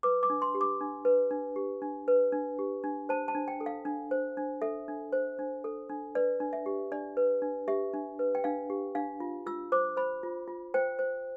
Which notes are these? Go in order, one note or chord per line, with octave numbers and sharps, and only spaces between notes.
B4 D6
D6
D4
C6
G4
D6
D4
B4
D4
G4
D4
B4
D4
G4
D4
C5 A5
A5
D4
G5
A4
F5
D4
C5
D4
A4 E5
D4
C5
D4
A4
D4
B4 D5
D4
E5
G4
D4 D5
B4
D4
G4 E5
D4
B4
G5
D4 F5
G4
D4 F5
F4
F4 E6
C5 D6
C5 B5
F4
F4
C5 G5
C5